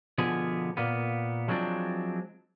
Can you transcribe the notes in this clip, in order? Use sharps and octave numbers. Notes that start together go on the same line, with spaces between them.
B2 D3 F3 B3 G#4
A#2 A#3 B3
F3 F#3 G#3 C4 D4